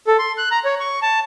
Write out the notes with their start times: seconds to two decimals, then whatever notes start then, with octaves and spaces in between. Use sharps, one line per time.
0.07 A4
0.19 C6
0.38 F#6
0.51 A#5
0.65 C#5
0.80 C#6
1.02 A5